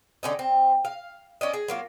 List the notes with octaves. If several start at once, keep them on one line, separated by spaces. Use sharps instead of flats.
D3 C#4 D#4
C4
F5
C#4 D5 D#5
G#4
F#3 A#3 F4